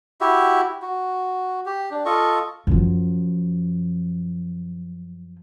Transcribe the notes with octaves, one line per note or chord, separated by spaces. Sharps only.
E4 F#4 G4 E5
F#4
G4
D4
F4 A4 D#5 C#6
F#2 F3